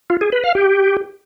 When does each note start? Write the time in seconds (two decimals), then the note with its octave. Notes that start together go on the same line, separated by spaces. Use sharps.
0.10 F4
0.21 G#4
0.32 B4
0.44 F5
0.55 G4